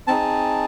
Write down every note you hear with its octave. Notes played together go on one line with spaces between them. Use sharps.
C4 D#4 G#4 A5